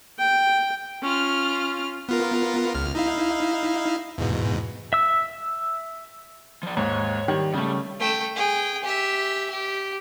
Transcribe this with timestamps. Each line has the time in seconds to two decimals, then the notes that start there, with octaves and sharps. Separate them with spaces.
0.19 G5
1.01 C#4 F4 F6
2.09 B3 F4 A#4
2.75 C#2 F6
2.95 D#4 E4 F5
4.18 E2 G#2 B2
4.93 E5 E6
6.63 F3 D5
6.77 D#2 G#2 C#5
7.28 D#3 G3
7.53 C#3 G3 A3 G4
8.00 A3 G5
8.36 G#4 G5
8.84 G4 E5
9.50 G4